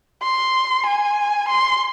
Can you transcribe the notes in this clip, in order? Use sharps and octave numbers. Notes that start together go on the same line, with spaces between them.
C6
G#5
C6